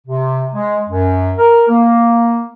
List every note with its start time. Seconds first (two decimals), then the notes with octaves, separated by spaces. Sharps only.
0.07 C3
0.54 G#3
0.89 F#2
1.38 A#4
1.68 A#3